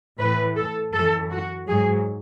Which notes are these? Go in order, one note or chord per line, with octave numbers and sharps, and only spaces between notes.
A2 E3 B4
A4
F#2 E3 A4
F#4
G#2 F#3 G#4